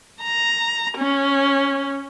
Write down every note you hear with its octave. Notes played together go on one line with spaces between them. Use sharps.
A#5
C#4